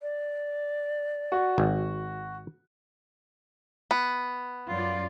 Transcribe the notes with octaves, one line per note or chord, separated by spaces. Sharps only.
D5
F#4
G#1
B3
F#2 F4 D5